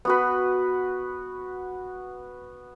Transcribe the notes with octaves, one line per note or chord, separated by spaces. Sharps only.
B3 F#4 B4